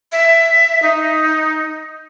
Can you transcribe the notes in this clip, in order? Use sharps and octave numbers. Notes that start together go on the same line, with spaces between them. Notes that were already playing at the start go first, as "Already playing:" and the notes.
E5
D#4